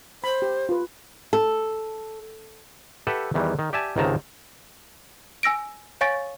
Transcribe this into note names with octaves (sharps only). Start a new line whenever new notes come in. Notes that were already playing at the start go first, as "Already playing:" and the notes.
C5 B5
G4
F4 B4
A4
G4 A4 B4 E5 F#5
E2 D#3 E3 G3
D#3
G4 D5 E5 G#5 A5
C#2 G#2 C3 D#3 A5 A#5
G#5 E6 A#6 D7
C#5 F5 G#5 C#6 A6 D7